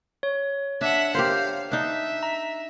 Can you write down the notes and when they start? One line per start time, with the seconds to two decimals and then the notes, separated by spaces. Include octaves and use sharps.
0.23 C#5
0.81 D4 E5 F#5
1.15 G4 A#4 C5 F5
1.72 D4 D#4 E5
2.23 A#5